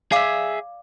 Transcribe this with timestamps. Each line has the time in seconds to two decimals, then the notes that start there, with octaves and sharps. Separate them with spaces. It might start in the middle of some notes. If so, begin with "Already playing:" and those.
0.12 G#4 D5 E5 F5 D6